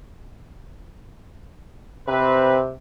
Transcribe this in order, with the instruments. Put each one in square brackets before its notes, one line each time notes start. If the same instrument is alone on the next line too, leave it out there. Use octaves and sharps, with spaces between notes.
[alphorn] C3 [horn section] C4 B4